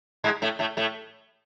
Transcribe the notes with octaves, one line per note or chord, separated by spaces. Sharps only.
G#2 G#3
A2 A3
A2 A3
A2 A3